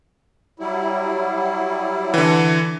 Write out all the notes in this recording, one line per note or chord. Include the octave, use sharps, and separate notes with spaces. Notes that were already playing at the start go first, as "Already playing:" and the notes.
F#3 G3 E4
D3 E3